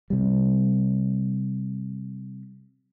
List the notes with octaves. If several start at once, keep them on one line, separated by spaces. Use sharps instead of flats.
C3 G3